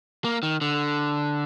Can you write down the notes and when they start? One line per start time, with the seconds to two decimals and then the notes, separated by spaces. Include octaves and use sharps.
0.24 A#3
0.43 D#3
0.61 D3